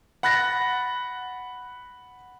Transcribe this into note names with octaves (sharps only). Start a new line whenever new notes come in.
F#5 B5 F#6 A6 A#6